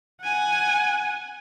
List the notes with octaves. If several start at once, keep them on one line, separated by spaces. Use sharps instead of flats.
F#5 G#5